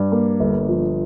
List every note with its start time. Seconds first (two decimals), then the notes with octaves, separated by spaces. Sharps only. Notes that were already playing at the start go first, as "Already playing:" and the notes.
Already playing: G2
0.12 A#3
0.40 G1
0.69 F3